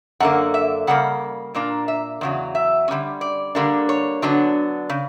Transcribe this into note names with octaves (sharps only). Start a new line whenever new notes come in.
F#2 D3 A#3 F#5
E5
C#3 G3 A#3 F#5
A#2 A#3 D4
E5
E2 C#3 F#3
E5
D3 G3 C#4
D5
D3 G3 A#3 D4
C#5
D3 F#3 B3 D4
C#3